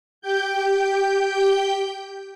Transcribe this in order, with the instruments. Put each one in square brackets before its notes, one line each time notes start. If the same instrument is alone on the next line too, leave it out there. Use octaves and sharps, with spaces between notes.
[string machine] G4 G5 G6